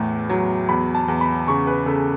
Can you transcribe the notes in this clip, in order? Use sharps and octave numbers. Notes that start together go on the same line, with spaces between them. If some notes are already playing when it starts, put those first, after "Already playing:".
Already playing: E2 A2
F#3
E2 B5
A5
E2
B5
C#3 C#6
B4
C#3 A4